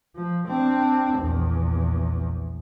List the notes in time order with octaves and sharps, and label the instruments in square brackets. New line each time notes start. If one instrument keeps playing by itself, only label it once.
[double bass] F3
C4 D4
A#1 E2